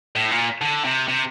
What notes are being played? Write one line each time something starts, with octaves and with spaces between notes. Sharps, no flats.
A2
A#2
D3
C3
C3